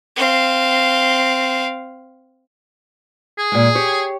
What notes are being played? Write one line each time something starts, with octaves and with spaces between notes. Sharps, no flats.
C4 F5
G#4
A#2 G#3
G4 C#5